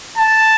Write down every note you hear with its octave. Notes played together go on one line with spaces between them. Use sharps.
A5